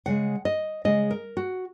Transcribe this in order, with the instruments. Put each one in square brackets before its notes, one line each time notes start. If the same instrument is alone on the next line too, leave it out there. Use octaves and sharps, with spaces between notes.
[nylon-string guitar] C#3 G#3 F#5
D#5
C#3 G#3 D#5
A#4
F#4